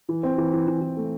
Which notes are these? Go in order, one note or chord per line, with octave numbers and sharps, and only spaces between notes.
E3
C4
E3
E3
E3
E3
A3